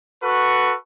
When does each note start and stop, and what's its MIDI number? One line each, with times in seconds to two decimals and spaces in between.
0.22 0.74 66
0.22 0.74 69
0.22 0.74 71
0.22 0.74 85